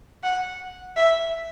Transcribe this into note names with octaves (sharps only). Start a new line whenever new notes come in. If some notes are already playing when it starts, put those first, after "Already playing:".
F#5
E5